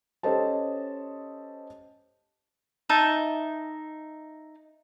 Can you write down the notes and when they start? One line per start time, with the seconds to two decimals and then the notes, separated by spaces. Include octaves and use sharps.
0.23 C#4 G4 A4 C5 D#5 A5
2.89 D#4 E5 A5